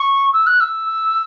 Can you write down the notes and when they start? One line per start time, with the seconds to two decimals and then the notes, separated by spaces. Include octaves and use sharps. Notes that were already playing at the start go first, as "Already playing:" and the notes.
Already playing: C#6
0.33 E6
0.47 F#6
0.60 E6